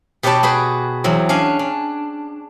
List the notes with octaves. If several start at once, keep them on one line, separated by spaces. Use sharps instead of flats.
B2 G4 B4 C#5 D5 A5
F#4 G#4 B4 G5
E2 F#3 C4
C#4 D4 F5 G#5
D4